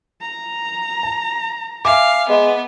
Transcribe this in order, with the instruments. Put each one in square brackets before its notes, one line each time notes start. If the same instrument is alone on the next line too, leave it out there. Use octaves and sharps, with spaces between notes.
[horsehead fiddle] A#5
[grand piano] A5
[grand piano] E5 G#5 D6 [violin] F5
[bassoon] G#3 [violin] B3